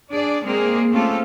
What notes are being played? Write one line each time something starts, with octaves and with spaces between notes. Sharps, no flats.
D4 G#4 D5
G#3 A#3 C4 G#4
A3 C4 C#4 F4 G4 A4